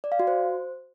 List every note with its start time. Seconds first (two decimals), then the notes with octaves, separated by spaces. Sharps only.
0.04 D5
0.12 F5
0.20 F#4
0.27 C5